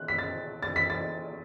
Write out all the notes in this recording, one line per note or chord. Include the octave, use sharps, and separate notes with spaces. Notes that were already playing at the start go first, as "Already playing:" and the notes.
Already playing: F#6
B6
A6
A6
B6
A6